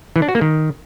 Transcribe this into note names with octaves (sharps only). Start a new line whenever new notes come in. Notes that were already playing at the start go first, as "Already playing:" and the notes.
E3
D4
F#4
A#3
D#3